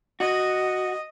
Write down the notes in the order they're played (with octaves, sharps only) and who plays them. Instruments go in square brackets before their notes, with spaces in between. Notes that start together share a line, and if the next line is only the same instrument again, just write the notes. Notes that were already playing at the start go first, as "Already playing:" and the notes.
[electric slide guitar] F#4 [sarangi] D#5